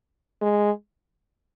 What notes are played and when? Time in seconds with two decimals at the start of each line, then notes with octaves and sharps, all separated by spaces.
0.41 G#3